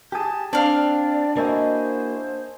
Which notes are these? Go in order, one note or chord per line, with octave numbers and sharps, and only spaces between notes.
G4 G#4 A5
C4 D4 D5 F5
A#3 E4 F#4 G#4 C5 D#5 G#5